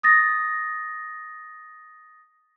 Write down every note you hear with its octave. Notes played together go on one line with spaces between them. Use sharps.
D#6 A6 A#6